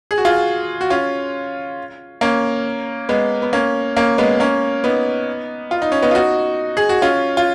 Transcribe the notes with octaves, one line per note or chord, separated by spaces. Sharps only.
G#4
F#4
F4 G#4
F#4
C#4 F4
A#3 C#4
G#3 B3
B3
A#3 C#4
A#3 C#4
G#3 B3
A#3 C#4
B3 D#4
F4
D#4
C#4
B3 D#4
F4
D#4 F#4
G#4
F#4
C#4 F4
F4